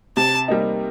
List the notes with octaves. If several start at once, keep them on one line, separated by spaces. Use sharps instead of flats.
C3 A5
G3 A#3 D#4